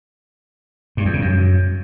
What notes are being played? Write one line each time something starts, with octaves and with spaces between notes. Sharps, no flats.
G2
E2
C#3
F#2